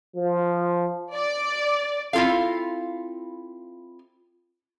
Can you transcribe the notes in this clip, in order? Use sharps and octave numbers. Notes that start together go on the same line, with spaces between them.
F3
D5
C4 E4 F4 A4 F5